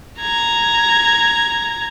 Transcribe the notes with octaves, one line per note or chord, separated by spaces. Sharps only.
A#5 G#6